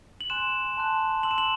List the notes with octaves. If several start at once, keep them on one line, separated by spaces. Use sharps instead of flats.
F#7
G#5 C6 F#6 E7
A5 C6 F#6
C6 E6 F#7
E7
F#7